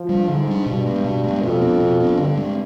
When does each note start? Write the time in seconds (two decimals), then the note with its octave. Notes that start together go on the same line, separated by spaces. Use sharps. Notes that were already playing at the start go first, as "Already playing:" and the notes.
Already playing: F3
0.09 G3 D4
0.28 G#2 D3
0.47 G3 D4
0.66 G2 B2
0.86 G#3 B3
1.04 B2
1.24 G#3 B3
1.43 F2 B2
1.61 B3 D4
1.80 B2
2.00 B3 D4
2.19 G2 D3
2.37 G#3 C4